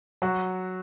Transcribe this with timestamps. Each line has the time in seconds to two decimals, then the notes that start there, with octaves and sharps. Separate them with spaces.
0.22 F#3 F#4